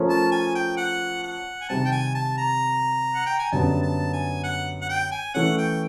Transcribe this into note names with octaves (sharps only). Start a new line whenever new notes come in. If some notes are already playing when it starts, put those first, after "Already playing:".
Already playing: F3 A3 C#4 F4 A#4
A5
G#5
G5
F#5
F#5
G#5
C3 D#3 G3 C4 A5
G5
G#5
A5
A#5
F#5
G5
G#5
F#2 D3 G3 B3 A5
A5
G#5
F#5
F#5
G5
G#5
E3 A3 C#4 F#5
G5